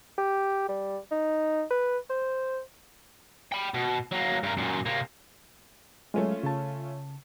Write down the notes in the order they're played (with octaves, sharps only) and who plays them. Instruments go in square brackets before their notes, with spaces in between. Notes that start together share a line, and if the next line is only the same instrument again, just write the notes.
[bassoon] G4
G3
D#4
B4
C5
[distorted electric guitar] G5 B5
B2
F#3 A#3
G2 A#4
F#2 A#2
C3 A#3
[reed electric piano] F#3 G#3 [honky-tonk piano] A3 C#4 F4
[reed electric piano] C#3 A5